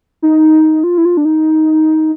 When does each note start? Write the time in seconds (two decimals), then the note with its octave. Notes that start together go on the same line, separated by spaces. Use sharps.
0.22 D#4
0.84 F4
0.98 E4
1.05 F4
1.17 D4
1.25 D#4